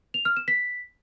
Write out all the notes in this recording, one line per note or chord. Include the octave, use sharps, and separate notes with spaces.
F7
F6
E7
B6